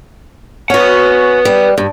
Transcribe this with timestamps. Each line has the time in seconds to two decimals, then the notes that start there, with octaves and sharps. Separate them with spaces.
0.70 C#4 F#4 B4 F#5
1.45 G3
1.78 G2